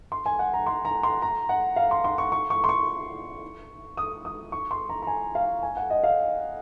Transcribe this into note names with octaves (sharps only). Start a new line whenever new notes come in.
C6
G#5
F#5
A#5
C6
A#5
C6
A#5
F#5
F5
C6
C6
C#6
C#6
C#6
C6
C#6
D#6
D#6
C#6
C6
A#5
A#5
G#5
F5
G#5
F#5
D#5
F5